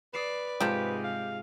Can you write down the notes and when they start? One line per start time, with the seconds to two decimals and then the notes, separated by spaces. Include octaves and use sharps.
0.13 B4 D5 D#6 C7 E7
0.60 G#2 C3 F3 G#3 F4 G4
1.04 F5